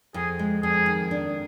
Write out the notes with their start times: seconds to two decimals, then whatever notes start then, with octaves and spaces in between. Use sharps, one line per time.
0.14 F2 G#4
0.39 G#3
0.63 F2 G#4
0.86 D#3
1.11 D4